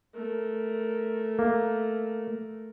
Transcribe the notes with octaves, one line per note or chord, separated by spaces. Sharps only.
A3 A#4
A#3